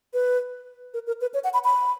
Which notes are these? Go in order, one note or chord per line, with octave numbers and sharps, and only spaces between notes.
B4
A#4
A#4
B4
C#5
F#5
B5
B5